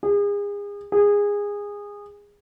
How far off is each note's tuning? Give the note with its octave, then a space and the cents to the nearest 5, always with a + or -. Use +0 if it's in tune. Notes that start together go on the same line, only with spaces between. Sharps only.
G#4 -35
G#4 -20